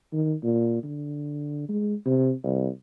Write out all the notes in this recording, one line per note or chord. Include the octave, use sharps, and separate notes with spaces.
D#3
A#2
D3
G#3
C3
C2